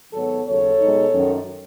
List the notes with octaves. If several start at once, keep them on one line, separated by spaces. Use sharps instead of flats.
G#2 D#3 F#3 B3 A4 C#5
D#2 C#3 F#3 A4 C#5
B2 G#3 D#4
F#2 D#3 F#3 C#4